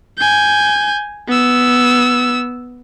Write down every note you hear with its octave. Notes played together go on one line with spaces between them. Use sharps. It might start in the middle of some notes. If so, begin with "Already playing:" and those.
G#5 G6
B3 E6